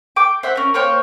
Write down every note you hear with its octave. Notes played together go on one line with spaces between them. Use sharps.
G5 D6
C5 E5 F#5
C#4 A#4
A#3 C5 C#5 G5